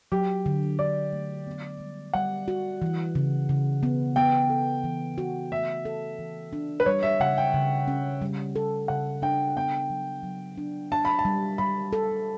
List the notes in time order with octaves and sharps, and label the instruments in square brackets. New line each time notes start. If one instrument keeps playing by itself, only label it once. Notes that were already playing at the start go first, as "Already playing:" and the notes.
[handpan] F#3 [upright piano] G4
[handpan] D3
[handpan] D3 [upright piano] D5
[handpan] A3
B3
G3
[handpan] G3 [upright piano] F#5
[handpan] F#4
E3
C#3
C#3
B3
[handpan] B3 [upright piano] G5
[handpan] A4
E3
F#4
[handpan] A3 [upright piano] E5
[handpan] A4
E3
D4
[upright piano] B4
[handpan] G3 [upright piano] C#5
[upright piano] E5
[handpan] C#3 [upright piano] F#5
[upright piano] G5
[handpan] C#3
C#4
G3
A4
[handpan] C#3 [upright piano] F#5
[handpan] D4 [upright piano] G5
[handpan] B3 [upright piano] G5
[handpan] F#3
F#3
D4
[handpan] D4 [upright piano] A5
[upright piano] B5
A5
[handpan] G3
[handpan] G3 [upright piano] B5
[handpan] A4